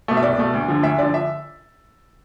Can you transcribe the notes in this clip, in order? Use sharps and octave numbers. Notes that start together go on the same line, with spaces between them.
B2 A3
E5
C2 D5
B2 A3
D2
D3 F3
D2 E5
D3 F3 D5
E5